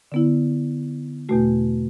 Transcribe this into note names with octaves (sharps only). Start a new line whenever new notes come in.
D3 B3 E4
E2 B2 A3 F#4